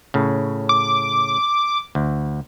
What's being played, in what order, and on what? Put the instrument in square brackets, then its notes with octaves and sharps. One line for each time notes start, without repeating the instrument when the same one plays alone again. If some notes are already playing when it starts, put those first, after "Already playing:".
[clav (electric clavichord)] A2 C#3
[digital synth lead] D6
[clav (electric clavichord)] D2